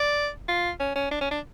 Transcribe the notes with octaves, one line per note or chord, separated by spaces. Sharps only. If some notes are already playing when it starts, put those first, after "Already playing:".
Already playing: D5
F4
C#4
C#4
D4
C#4
D4